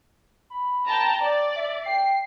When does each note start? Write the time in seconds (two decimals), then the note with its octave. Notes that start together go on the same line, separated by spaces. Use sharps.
0.50 B5
0.87 G5 A5 A#5
1.21 D5 A6
1.56 E5
1.86 G5 C7